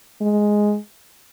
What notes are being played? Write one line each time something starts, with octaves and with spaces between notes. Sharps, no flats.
G#3